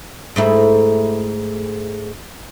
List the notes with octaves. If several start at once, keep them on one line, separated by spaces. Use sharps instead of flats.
G#2 A3 E4